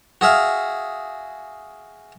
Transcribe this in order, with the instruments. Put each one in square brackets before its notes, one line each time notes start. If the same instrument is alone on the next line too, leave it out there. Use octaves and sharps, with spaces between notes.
[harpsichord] F#4 G#4 E5 F5